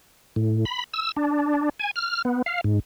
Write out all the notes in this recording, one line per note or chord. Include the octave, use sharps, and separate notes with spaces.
A2
B5
E6
D4
G#5
F6
B3
F5
G#2